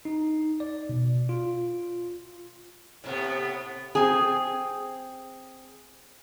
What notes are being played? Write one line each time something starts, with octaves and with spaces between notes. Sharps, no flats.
D#4
D5
B2
F4
A2 C3 B3
C4 G#4